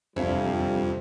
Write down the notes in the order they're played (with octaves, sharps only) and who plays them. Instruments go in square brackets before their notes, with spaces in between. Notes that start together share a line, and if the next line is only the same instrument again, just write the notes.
[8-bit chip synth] F2 [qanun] C3 [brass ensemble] F3 G3 [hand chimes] D4 F5